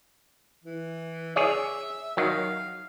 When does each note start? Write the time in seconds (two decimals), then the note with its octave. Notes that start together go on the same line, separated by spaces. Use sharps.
0.65 E3
1.36 G#4 C#5 D5 E5
2.17 D#3 F#3 F5